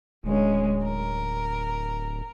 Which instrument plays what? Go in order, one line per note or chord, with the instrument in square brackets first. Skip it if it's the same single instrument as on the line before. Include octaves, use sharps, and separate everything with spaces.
[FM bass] D1 [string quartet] G#3 C#4
[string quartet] A#4